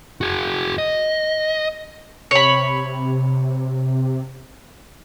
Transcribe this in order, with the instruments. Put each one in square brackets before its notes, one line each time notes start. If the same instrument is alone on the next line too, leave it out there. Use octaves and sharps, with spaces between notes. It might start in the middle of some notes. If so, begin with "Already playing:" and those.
[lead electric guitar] F#4 G#4
D#5
[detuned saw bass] C3 [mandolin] C#5 B5